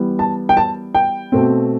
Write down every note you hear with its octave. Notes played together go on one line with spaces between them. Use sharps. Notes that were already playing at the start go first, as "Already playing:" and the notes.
Already playing: E3 G3 B3
A5
G5
A5
G5
B2 A3 C4